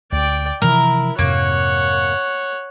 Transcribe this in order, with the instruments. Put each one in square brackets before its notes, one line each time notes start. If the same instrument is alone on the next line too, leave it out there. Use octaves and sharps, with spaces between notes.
[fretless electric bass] D2 [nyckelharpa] D5 G5
[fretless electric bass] C3 E3 F3 [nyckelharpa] E4 [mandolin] A#4
[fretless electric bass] F2 G#2 C3 [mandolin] A#3 [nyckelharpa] C#5 F#5